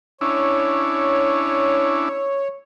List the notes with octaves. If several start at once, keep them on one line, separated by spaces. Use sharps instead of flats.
C#4 D4 E4 C#5